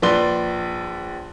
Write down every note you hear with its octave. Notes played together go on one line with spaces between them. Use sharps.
A#1 B4 D5 C6 G7